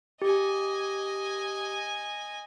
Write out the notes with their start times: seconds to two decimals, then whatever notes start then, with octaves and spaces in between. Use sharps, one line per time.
0.22 G4 D#5 G#5